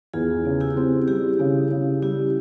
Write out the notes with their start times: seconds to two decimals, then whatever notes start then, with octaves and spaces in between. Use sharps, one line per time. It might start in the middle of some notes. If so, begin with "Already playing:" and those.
0.13 E2 F4 G#4
0.45 C#3
0.60 E4 G4
0.77 C4
1.07 G3 E4 G4
1.39 C#3
1.71 C#3
2.02 G3 E4 G4